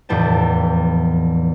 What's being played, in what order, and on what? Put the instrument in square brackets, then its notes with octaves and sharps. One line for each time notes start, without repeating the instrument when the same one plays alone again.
[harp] F1 E2 A2 G5 A5